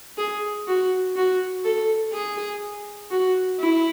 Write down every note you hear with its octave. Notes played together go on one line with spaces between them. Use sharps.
G#4
F#4
F#4
A4
G#4
F#4
E4